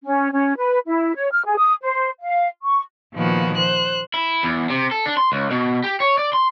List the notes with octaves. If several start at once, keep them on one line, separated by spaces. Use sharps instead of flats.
C#4
C#4
B4
E4
C#5
F6
G#4
D#6
C5
F5
C#6
A#2 D#3 F3 A#3 B3 F#4
C5 F#6
E4
E2
C3
A4
D4
C6
C#2
B2
G4
C#5
D5
C6